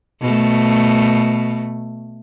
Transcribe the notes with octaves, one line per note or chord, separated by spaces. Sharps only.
B2 A3